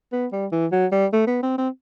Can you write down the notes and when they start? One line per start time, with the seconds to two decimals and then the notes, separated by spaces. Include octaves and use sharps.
0.12 B3
0.32 G3
0.52 E3
0.72 F#3
0.92 G3
1.13 A3
1.27 B3
1.43 C4
1.58 C4